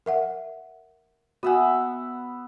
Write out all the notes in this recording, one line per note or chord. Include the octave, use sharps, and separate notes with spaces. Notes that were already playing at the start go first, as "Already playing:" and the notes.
A#4 E5 F#5
B3 F#4 E5 F#5 G#5